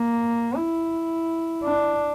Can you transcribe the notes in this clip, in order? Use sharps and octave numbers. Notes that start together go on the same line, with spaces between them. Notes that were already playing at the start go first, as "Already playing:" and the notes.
Already playing: A#3
E4
D4